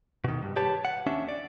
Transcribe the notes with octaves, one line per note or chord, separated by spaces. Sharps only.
B2 D#3
G2
G4 B4 C#5 A5
F#5
D#2 C#4 D4 E5
D5